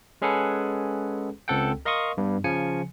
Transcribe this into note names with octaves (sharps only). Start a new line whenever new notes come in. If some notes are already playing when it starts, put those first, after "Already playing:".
G#3 C#4 G#4 A4 B4 F#5
C#2 C4 A4 F#5 G5
A#4 D#5 F5 C6 C#6 D#6
G2 G3 B3
C#3 F3 G#5 C#7